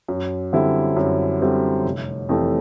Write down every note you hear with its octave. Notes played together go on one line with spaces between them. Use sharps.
F#2
D3 G3 C4 E4
F#2
D3 G3 C4 E4
F1
F2 C3 E3 A3